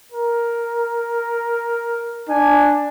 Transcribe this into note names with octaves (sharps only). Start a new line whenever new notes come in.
A#4
D4 G#5